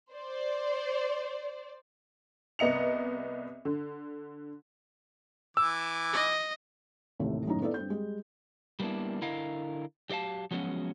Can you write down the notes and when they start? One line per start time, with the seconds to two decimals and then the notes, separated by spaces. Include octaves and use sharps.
0.11 C5 D5
2.59 C2 B3 D#5 C#7 F7
3.65 D3
5.57 E3 D6 E6
6.13 D#5
7.19 A1 D#2 A2 C3 A3
7.47 F#2 A2 D#3 C#4 D#4 A#5
7.62 B3 D#4 E4 A4 D5
7.74 G2 C4 G6
7.90 G3 G#3 G4
8.80 G3 A#3 B3 D4 E4
9.22 D3 E4 A#4 D#5 F5
10.10 F#3 G4 D5 F5 A5
10.51 F3 F#3 G#3 B3 C#4 F#4